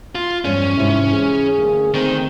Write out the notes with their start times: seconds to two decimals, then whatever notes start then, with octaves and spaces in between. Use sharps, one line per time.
0.15 F4
0.45 E2 G2 F3 C#4 C#5
0.77 G#2 C3 E4 E5
1.12 E3 G#4
1.58 D2 A#3
1.95 D#3 C4